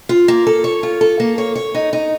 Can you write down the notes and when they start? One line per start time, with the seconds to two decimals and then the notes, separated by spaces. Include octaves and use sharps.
0.09 F4
0.28 A#3
0.47 A4
0.64 C#5
0.83 F4
1.01 A4
1.20 A#3
1.38 C#5
1.55 C#5
1.75 D#4
1.93 D#4